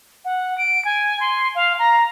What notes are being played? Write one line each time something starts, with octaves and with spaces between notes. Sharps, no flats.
F#5
D7
G#5
C6
F5
A#5